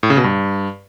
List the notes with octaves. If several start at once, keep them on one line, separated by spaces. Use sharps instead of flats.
A2
C#3
B2
G2